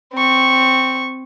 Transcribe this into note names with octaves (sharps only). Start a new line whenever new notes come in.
C4 C#6